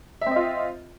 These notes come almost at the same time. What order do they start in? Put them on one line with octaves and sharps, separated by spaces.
E5 C4 D#5 F4